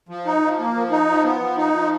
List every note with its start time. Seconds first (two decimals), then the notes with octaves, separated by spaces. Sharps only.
0.09 F3
0.25 D#4
0.42 F3
0.59 A#3
0.75 F3
0.91 D#4
1.08 F3
1.24 B3
1.41 F3
1.57 D#4
1.73 F3